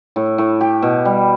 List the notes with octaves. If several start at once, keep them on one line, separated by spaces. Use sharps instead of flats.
A2
A2
G4
B2
G3